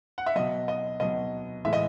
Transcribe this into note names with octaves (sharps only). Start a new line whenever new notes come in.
F#5
E5
B2 F#3 D#5
D#5
B2 F#3 D#5
A2 E3 G#3 E5
D#5